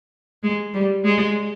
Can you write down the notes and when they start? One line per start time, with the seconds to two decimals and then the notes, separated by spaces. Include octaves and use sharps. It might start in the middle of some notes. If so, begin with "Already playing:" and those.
0.43 G#3
0.74 G3
1.04 G#3